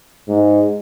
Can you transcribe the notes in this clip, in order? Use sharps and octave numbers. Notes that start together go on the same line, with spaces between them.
G#2